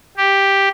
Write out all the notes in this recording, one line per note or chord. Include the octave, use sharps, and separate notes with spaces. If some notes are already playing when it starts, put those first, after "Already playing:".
G4